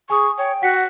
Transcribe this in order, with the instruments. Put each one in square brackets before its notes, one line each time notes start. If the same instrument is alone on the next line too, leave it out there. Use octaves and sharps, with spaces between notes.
[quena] G#4 [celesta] G#5 D#6 [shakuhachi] C#6
[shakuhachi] C#5 [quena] G5
[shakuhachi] F#4 [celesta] F#5 B6 C#7